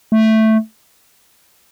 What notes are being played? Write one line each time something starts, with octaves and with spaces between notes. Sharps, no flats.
A3